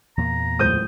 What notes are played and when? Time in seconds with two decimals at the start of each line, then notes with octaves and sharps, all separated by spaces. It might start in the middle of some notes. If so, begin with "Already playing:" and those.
0.17 E2 A#2 A#3 A#5
0.59 D1 C#2 C5 D#6 G6